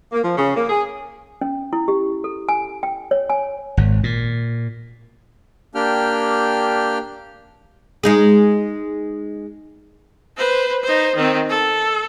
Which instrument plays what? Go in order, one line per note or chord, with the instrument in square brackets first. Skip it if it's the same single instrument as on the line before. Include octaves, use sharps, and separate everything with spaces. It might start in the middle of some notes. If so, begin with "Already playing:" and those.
[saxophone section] A#3
F3
C#3
A#3
G#4
[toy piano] C#4
E4
G4
A4
G#5
G5
C#5
G#5
[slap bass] G#1
A#2
[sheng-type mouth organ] A#3 D4 G4 G5 F6
[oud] G#3 D#4 G#4
[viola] B4 C5
D#4 C5
D#3 C4
A4